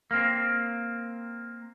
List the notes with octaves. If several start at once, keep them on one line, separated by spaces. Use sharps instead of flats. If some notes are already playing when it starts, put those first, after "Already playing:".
A#3 C4